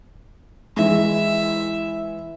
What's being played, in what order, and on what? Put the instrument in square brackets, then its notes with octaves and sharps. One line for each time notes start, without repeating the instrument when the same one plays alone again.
[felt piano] E3 G#3 [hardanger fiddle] E5